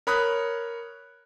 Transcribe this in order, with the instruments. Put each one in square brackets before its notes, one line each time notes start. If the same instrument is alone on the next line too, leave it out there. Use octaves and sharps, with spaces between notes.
[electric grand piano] A#4 C#5 B5 D#6 F#6